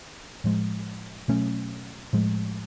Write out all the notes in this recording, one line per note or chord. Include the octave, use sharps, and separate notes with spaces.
A2 F3 G#3
B2 F#3 A3 C#4
A2 F3 G#3